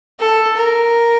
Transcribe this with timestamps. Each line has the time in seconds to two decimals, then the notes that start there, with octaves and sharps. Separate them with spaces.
0.20 A4
0.57 A#4